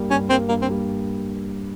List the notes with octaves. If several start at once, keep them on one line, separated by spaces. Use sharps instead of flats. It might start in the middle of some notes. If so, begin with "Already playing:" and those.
Already playing: G2 G3 A#3
G2 C#4
G3 A#3 C4
G2 A#3
C4
G3 A#3